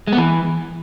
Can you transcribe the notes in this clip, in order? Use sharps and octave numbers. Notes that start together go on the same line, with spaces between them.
G#3
B3
E3